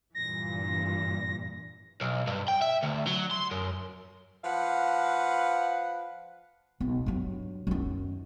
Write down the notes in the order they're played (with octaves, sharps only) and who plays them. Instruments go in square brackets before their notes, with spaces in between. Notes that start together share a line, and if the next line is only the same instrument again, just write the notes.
[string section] G2 A#2 E3 [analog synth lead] A#6
[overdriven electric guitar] B1
G2
G5
E5
D2
F#3
C6
F#2
[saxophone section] F3 B4 F5 F#5
[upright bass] B1
G2 F#3
F#2 D#3